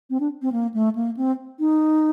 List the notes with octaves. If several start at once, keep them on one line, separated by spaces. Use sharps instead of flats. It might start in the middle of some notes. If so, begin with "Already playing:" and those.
C4
D4
C4
A#3
A3
A#3
C4
D#4